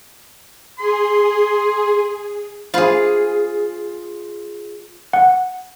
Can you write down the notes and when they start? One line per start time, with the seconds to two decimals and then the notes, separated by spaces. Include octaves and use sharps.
0.79 G#4 C6
2.74 F4 G#4 C5 F5 B5
5.13 F#5